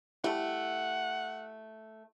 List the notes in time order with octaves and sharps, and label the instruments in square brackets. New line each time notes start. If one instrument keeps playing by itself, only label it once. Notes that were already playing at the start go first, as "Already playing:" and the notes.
[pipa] A3 A4 [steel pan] E4 G4 [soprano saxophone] F#5